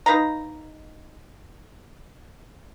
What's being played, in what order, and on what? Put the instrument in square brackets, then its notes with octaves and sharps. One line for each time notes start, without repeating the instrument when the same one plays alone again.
[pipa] D#4 B4 F5 A#5